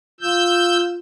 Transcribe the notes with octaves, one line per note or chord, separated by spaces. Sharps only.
F4 E6 G6